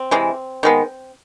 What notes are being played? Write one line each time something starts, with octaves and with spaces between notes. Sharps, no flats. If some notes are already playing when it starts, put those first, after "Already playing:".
Already playing: C4
C3 E3 G#3
D#3 G#3 B3